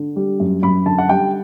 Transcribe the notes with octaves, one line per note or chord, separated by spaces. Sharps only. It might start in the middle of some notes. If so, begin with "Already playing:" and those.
Already playing: D3
G3
F#2
F#2 B5
D3 A5
F#5
G3 G5